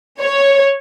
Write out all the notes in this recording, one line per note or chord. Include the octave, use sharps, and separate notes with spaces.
C#5